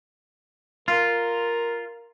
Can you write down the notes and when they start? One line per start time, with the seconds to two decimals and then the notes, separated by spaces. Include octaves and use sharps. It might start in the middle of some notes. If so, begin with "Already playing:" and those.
0.88 F4 A#4